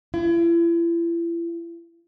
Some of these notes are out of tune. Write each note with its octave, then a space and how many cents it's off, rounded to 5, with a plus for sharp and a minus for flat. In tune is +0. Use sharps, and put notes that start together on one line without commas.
E4 +40